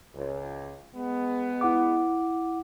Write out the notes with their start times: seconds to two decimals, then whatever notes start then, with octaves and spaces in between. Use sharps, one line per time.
0.14 C#2
0.93 G#3 B3
1.61 E4 F#5 D6